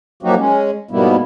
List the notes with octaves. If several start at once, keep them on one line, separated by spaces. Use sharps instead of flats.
F3 F#3 A#3 D#4 F#4 G4
G#3 C#4
G#2 B2 G3 A#3 B3 E4